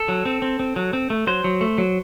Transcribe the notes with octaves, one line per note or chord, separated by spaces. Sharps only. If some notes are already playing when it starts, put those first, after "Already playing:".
Already playing: A4
F#3
C4
C4
C4
F#3
C4
A3
F#3 C5
F#3
A3
F#3